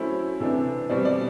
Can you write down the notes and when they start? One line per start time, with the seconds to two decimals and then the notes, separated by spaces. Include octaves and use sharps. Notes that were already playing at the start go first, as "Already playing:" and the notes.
Already playing: F#3 A3 C#4 E4 C5
0.40 C3 E3 A3 D4
0.89 B2 G3 C4 D5
1.05 D5